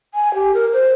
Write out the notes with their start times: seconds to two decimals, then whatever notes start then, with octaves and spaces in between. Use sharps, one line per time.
0.14 G#5
0.34 G4
0.54 A#4
0.73 C5